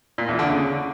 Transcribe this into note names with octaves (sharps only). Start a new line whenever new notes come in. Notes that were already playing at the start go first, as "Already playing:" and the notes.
A#2
E2
D3
C#3